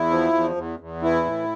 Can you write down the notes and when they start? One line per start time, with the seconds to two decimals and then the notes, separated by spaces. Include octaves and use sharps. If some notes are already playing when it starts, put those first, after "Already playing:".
Already playing: E2 E4
0.10 F3
0.32 E2
0.55 E2
0.79 E2
1.02 E3 E4
1.25 A2